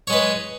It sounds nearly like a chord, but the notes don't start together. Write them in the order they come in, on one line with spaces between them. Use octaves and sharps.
C#5 G#3 B4